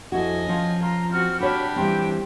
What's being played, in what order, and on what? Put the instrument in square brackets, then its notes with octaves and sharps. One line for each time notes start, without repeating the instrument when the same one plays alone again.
[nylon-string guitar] F2 E4 F#4 [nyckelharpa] D#5 G#5
[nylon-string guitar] F3 C#4
[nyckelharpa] F4 [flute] A#5
[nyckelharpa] C4 F#4 [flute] F6
[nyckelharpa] D4 G4 [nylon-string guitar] F#4 C#5 [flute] B5
[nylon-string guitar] E3 G3 C4 [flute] G5